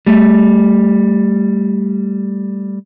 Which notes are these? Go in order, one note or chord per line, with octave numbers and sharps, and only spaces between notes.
G3 A3